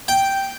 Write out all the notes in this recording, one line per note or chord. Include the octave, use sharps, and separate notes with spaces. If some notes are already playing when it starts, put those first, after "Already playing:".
G5